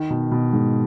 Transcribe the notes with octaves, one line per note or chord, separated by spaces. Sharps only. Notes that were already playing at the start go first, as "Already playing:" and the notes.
Already playing: D#3
B2
B2
G#2